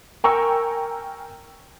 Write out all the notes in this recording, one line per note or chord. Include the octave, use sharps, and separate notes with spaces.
A#4 G5 G#5 A#5 C#6 E6